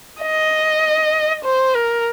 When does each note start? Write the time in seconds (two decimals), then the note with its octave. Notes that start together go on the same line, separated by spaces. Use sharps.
0.22 D#5
1.45 C5
1.76 A#4